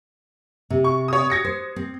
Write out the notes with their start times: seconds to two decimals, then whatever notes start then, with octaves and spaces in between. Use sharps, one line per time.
0.70 C3
0.84 C#6
1.08 C#5 D#6
1.30 G#6 A#6 C#7
1.44 C5
1.76 C4